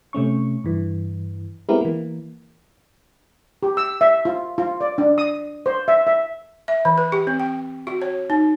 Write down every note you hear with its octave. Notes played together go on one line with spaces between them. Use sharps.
C3 A3 C#4 C#6
G2 E3
G#3 B3 C4 E4 G4 A#4
E3 A#3
G4
E6
E5
F4
F4
D5
D4
D#6
C5
E5
E5
E5
E3
B4
G4
C4
G5
F#4
C#5
D#4